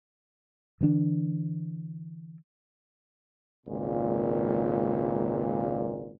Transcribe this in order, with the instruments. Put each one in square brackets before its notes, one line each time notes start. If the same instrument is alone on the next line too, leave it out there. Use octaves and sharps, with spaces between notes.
[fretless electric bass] D3 E3 B3 D4
[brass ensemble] G#1 C#2 A#2